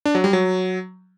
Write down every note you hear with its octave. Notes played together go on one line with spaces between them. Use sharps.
D4
F#3
G3
F#3